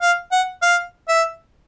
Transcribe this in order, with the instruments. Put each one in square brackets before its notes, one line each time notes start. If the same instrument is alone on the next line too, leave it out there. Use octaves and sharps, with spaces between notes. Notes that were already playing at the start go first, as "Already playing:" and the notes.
[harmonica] F5
F#5
F5
E5